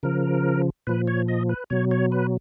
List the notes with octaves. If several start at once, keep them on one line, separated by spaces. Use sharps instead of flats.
C#3 F3 A#4
A#2 F3 B4
C#5
D#5
B4
B2 F#3 C#5
C#5
B4